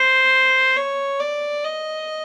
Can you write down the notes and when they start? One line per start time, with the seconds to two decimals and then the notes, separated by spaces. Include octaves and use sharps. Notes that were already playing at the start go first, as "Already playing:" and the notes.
Already playing: C5
0.77 C#5
1.20 D5
1.64 D#5